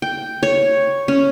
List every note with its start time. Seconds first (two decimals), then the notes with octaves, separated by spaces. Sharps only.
0.02 G5
0.43 C#5
1.08 C#4